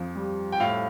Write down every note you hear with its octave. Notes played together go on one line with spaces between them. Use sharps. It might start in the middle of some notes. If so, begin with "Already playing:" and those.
Already playing: F2 F3
G3
G5
A2 F5